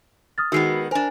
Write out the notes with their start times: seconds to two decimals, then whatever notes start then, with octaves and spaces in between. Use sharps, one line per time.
0.38 D#6 F6 A6
0.52 D#3 G#3 B3 F#4 E6 C7
0.91 D4 A#4 C5 G#5